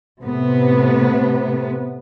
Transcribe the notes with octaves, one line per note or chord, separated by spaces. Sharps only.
A2 C3 B3